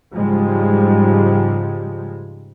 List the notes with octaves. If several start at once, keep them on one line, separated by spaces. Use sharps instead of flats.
G#2 C#3 F3 G3 G#3